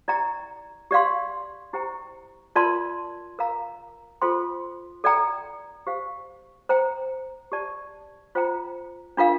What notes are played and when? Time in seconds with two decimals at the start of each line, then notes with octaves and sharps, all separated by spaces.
0.08 E4 G4 D5 G5 A#5
0.91 G4 D5 F5 C6
1.73 E4 G4 C5 G5 A#5
2.56 F4 A#4 D5 A5 C6
3.39 A#4 F5 A#5
4.22 F4 A4 C5 G5 C6
5.04 A4 D5 G5 A#5
5.87 G4 C5 F5
6.69 C5 G5 A#5
7.52 G4 D5 A5
8.35 F4 C5 G5 A#5
9.17 D4 F4 A#4 F5